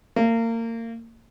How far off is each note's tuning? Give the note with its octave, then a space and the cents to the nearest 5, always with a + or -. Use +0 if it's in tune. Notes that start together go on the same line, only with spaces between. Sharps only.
A#3 -30